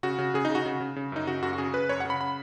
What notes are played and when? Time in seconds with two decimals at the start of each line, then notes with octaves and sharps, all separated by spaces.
0.03 C#3 F#4
0.19 C#3
0.34 C#3 G#4
0.45 D#4
0.50 C#3
0.55 F#4
0.66 C#3
0.80 C#3
0.96 C#3
1.12 F#2 D#4
1.27 C#3 F#4
1.42 F#2 F#4
1.53 F#4
1.58 C#3 G#4
1.74 C#3 B4
1.89 F#2 C#5
2.00 C#3 F#5
2.10 B5
2.21 B5